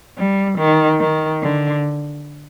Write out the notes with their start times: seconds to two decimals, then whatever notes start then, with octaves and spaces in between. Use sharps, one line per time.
0.18 G3
0.59 D#3
1.00 D#3
1.42 D3